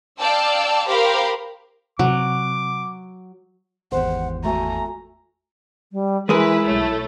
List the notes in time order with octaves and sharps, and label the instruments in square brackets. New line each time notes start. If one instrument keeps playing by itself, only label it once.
[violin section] D5 F5 G5 A5 E6
G4 A#4 C5 F5 B5
[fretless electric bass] C3 [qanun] F#3 [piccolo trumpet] D6
[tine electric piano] G#1 E2 [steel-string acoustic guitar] G4 C5 [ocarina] F#5
[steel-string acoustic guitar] A3 G#5 [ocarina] F#4 [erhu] A#5
[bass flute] G3
[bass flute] E3 [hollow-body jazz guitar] G#3 G#4 A#4 [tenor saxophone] E4 [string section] B4
[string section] B1 A3 [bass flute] C#5